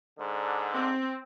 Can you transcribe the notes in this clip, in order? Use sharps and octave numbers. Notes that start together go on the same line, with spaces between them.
G#2 D3
C4